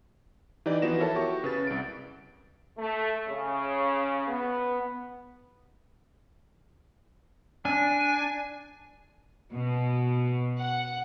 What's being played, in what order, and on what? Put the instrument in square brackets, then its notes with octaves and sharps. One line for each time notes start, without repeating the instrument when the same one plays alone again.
[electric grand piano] E3 D#4 G4 D5
E3 F3 B3 F#4 A#6 E7
E4 A4 A#4 C#5 E5 A5
F#4 G4 C#6
C#3 B4 A6
C2 D7
[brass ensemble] A3
C#3
B3
[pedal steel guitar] D4 [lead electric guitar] G#5
[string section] B2
F#5